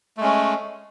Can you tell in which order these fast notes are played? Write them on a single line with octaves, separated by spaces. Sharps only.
A3 G#3 C#4